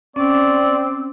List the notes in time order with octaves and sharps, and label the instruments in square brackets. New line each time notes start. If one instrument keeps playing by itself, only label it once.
[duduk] C4 [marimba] C#4 [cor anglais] D5